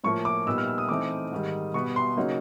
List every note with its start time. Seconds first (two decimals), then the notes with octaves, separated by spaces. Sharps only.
0.04 A2 F3 A#3 C#6
0.25 D6
0.46 A#2 G3 B3 D#4 E6
0.58 F6
0.68 E6
0.78 D#6
0.89 E3 A3 C4 D#4 D6
1.32 G#2 D#3 G3
1.74 B2 G3 B3 C#6
1.96 C6
2.17 C#3 F#3 A#3 D#4